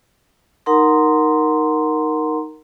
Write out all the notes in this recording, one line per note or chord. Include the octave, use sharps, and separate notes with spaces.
D#4 A#4 F#5 A#5 C6